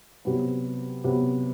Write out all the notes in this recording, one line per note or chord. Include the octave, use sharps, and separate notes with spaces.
C3 F#3 B3
C3 F#3 B3